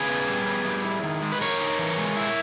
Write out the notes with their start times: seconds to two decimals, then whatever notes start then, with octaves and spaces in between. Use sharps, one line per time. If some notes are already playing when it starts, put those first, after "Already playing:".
Already playing: C#3 G#4 B4
0.08 B3
0.27 G3
0.46 B3
0.65 G3
0.84 E4
1.03 D#3
1.22 G#3
1.32 B4
1.41 D#3 A#4 C#5
1.60 D#4
1.79 E3
1.98 G#3
2.17 E4